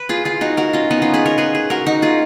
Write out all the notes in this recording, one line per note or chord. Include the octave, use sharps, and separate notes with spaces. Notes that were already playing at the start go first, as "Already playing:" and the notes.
Already playing: B4
F4 G#4
F4 G#4
D#4 F#4
F#4 A#4
C#4 F4
B3 D#4
C#4 F4
G#4 B4
A#4 C#5
G#4 B4
G#4 B4
F#4 A#4
D#4 F#4
F4 G#4